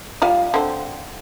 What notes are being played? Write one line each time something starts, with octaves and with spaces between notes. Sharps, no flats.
G3 F4 F5
D3 C4